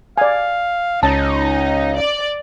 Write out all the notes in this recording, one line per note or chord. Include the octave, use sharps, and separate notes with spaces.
D5 F5 G#5
C#2 C#4 D#4 A5
D5